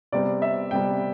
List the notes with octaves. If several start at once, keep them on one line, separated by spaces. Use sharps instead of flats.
C3 G3 B3 D5
E5
C3 G3 B3 G5